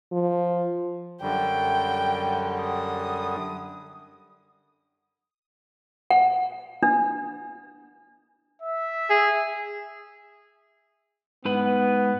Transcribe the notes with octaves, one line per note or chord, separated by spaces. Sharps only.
F3
F#2 D3 G3 G5
D#6
F#5
D4
E5
G#4
G#2 B3 B4